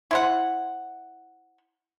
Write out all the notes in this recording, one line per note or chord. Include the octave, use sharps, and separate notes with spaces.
E4 C5 F#5